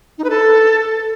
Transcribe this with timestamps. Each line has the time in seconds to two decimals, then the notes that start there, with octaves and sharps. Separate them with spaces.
0.18 D#4
0.24 B4
0.30 A4